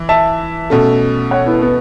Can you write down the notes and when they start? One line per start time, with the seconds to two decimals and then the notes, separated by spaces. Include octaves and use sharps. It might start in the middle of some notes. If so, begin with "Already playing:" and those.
Already playing: E3
0.09 E5 A5
0.70 B2 A3 C#4 A4
1.31 C#5 F#5
1.46 B3 E4
1.62 B3